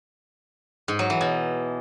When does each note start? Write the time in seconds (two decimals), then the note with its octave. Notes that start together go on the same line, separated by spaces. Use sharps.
0.88 G#2
0.99 F#3
1.10 E3
1.21 B2